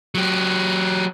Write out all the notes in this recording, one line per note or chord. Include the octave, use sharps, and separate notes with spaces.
F#3 G4